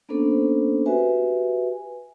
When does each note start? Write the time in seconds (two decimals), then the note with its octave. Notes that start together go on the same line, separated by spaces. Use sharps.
0.09 A#3 B3 C#4 D4 A4 C5
0.86 F#4 G4 B4 E5 G#5